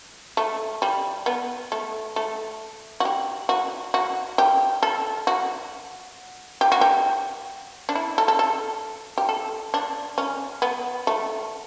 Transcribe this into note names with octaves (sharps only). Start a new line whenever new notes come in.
A3
G3
B3
A3
A3
F#4
G4
F#4
F#4
G4
A4
F#4
G4
F#4
G4
D4
E4
A4
A4
A4
G4
A4
D4
C#4
B3
A3